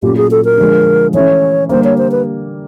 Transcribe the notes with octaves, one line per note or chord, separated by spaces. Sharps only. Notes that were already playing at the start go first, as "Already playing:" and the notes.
A#2 F#3 A3 C#4 F4 G4
G#4
A4
A#4
D3 F3 G#3
E3 A3 C#4 E4 C#5
D3 G3 A#3 C5
C#5
C5
B4